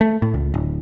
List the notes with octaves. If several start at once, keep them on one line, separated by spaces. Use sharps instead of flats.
A3
A2
C#2
D1